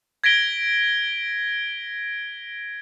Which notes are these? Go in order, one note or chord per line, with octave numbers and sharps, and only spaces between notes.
G#6 A#6 B6 D7 G7